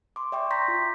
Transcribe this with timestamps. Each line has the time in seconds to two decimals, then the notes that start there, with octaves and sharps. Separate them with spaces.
0.16 C6 D6
0.32 D5 E5 G5 C#6 D6
0.50 A#5 C6 C#6 G6 A#6 B6
0.68 F4